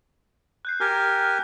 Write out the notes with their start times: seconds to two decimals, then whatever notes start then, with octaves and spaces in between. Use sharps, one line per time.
0.65 F#6 G6 C7
0.80 G4 A#4 G#5 F6 G6